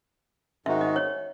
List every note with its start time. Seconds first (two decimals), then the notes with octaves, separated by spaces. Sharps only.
0.66 G#2 D#3 G#3 D#4 F#4 E5
0.81 D#5
0.96 C#5